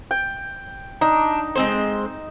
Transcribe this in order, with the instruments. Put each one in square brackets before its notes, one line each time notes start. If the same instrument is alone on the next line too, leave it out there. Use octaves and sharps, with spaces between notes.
[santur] G5
[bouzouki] D4 [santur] D#4
[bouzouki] G#3 C4 C5